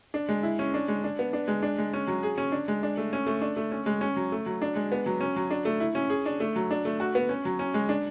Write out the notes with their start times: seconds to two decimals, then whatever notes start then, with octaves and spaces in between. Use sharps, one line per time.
0.14 D4
0.29 G#3
0.43 E4
0.59 C#4
0.74 D4
0.88 G#3
1.04 D4
1.19 B3
1.33 D4
1.48 G#3
1.62 D4
1.78 G#3
1.93 C#4
2.07 F#3
2.23 G#4
2.38 C#4
2.52 D4
2.68 G#3
2.83 D4
2.97 A3
3.13 C#4
3.26 A3
3.41 D4
3.56 A3
3.71 C#4
3.86 G#3
4.01 C#4
4.16 F#3
4.32 A3
4.46 F#3
4.62 D4
4.76 G#3
4.92 B3
5.06 F#3
5.21 C#4
5.36 F#3
5.50 D4
5.65 A3
5.80 E4
5.95 C#4
6.10 G#4
6.26 D4
6.40 A3
6.56 F#3
6.71 D4
6.85 A3
7.00 F#4
7.15 B3
7.29 C#4
7.45 F#3
7.59 C#4
7.74 G#3
7.89 D4